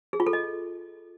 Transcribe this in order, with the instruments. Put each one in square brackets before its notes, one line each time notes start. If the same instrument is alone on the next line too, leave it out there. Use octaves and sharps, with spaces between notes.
[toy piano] G#4
F4
A4
D#5